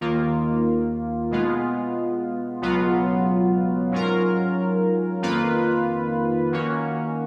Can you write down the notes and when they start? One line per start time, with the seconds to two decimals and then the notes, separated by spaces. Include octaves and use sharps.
0.01 D#2 D#3 A#3 F4
1.31 B2 G#3 B3 F4
2.61 C#2 B2 F#3 B3 F4
3.91 G#2 F#3 C#4 F4 A#4
5.22 F2 D#3 A#3 F4 B4
6.52 D#3 A#3 C#4 F#4